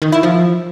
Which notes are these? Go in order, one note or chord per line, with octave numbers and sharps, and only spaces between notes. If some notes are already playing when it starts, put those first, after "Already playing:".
D#3
E4
F3